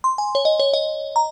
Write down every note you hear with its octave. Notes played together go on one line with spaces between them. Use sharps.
C6
G#5
C#5
D#5
C#5
D#5
A#5